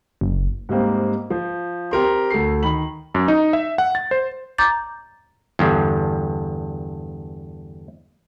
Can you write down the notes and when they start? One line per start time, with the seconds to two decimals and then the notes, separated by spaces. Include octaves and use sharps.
0.21 F#1
0.69 G#2 G3 A#3 C4
1.30 F3
1.91 C4 G4 A#4 C6
2.30 D2 A4 C7
2.63 D#3 B5 F#7
3.15 F#2
3.28 D#4
3.53 E5
3.78 F#5
3.95 A6
4.11 C5
4.58 A#5 D6 G6 A6
5.59 E2 G2 D3